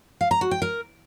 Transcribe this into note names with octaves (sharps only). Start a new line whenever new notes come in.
F5
A#5
F#4
G5
A#4